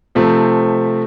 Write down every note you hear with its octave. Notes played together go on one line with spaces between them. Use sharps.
C3 F3 A3 C4